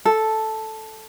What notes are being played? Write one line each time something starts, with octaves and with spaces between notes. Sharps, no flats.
A4